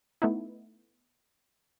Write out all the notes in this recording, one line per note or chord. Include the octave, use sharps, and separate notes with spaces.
A3 B3 D#4 E4